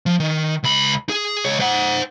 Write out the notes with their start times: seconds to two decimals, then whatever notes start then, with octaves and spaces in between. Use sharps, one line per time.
0.06 F3
0.20 D#3
0.63 C#2 B5
1.09 G#4
1.45 C#2 C#5
1.60 C5 F#5